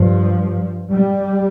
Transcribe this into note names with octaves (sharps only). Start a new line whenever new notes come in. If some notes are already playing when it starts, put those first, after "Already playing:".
Already playing: G2 F3
G3